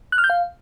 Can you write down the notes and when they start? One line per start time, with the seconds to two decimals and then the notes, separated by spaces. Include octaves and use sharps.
0.12 F#6
0.18 F6
0.24 G6
0.30 F5